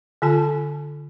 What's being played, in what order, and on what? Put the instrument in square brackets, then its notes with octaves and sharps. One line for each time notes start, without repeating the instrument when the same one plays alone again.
[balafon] D3 F4 A4 A5